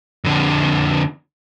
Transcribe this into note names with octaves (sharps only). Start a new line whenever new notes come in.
F2 D3